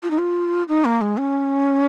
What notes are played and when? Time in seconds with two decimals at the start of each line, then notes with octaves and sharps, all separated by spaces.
0.03 F4
0.11 D#4
0.18 F4
0.69 D#4
0.85 A#3
1.01 G#3
1.17 C#4